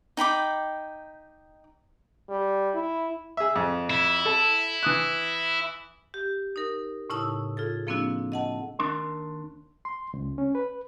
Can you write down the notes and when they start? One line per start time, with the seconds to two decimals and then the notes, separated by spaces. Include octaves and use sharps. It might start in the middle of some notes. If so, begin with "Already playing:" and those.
0.17 D#4 G5 B5 D6
2.29 G3
2.75 E4
3.37 G#4 E5
3.56 F2
3.90 E4
4.26 A4
4.83 E3 D#6 F#6
6.14 G4
6.56 D#4 A#4
7.10 A2 C#3 D#4 E4 A5 E6
7.57 F4 G#4 A4
7.87 F3 A#3 C4 D4 E4 F#4
8.32 D#5 F#5 A5
8.79 D#2 D4 A#4 C6
9.85 C6
10.14 C#2
10.38 C#4
10.55 B4